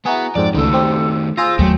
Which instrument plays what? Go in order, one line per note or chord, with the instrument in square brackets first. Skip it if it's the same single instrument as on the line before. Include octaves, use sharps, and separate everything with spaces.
[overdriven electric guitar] B3 [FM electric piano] E4 F#4 G#4 [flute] A#5
[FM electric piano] F2 G#2 C4 [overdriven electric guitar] D5
[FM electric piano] C#2 [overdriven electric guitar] D#3 A3 [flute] A4
[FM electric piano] C4 G4
[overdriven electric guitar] F4 [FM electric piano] G#4 C5 A#6 [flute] E6
[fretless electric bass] D#2 F#3 [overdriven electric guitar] A3 [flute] G5